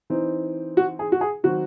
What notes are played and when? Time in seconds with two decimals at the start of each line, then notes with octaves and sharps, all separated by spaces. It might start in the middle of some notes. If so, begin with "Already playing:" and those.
0.10 E3 C4 D#4
0.77 F#4
0.99 G#4
1.12 F#4
1.21 G#4
1.43 D#3 F#3 C4 D#4 F#4